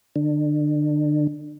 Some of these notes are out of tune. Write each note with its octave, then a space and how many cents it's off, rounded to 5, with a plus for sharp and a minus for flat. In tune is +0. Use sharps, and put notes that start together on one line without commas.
D3 +30